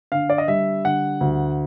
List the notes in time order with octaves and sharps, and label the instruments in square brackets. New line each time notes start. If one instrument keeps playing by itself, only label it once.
[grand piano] D3 F5
D5
D#5
G3 E5
D3 F#5
D2